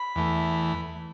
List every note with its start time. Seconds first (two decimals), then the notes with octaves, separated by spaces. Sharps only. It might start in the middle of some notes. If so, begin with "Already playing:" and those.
Already playing: B5
0.16 E2 E3 A3